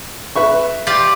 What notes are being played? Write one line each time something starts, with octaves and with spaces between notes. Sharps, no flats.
B4 E5 C#6
F4 G4 D5